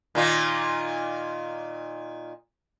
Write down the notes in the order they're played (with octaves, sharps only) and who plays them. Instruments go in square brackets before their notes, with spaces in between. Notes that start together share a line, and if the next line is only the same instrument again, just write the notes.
[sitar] A#2 D#3 F4